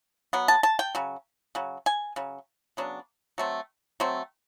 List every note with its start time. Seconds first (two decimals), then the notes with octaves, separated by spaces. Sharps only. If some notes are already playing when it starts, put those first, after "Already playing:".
0.33 F#3 B3
0.48 A5
0.63 A5
0.79 G5
0.95 C#3 F#3
1.55 C#3 F#3
1.86 G#5
2.16 C#3 F#3
2.77 C#3 F#3 B3 D4
3.38 F#3 A3 C4
4.00 F#3 A3 C4